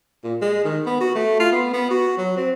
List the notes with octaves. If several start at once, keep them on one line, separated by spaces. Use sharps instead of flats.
A#2
G#3
D#3
B3
F#4
A3
F4
B3
B3
F#4
F#3
C4